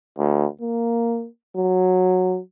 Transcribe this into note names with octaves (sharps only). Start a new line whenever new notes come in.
D2
A#3
F#3